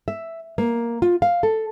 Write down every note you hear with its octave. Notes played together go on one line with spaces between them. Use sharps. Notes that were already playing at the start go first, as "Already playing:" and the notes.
E5
A#3
F4
F5
A4